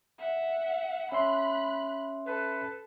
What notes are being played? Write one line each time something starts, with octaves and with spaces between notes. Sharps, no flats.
E5 F#5
C#4 E5 B5 C6 F#6
A4 B4